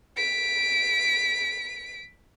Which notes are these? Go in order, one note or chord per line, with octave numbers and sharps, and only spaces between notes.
B6 D7